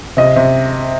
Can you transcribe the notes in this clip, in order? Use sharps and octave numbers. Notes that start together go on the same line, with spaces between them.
C3 D#5
C3